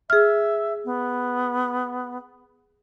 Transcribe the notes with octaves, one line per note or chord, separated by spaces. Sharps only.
G#4 E5 F6
B3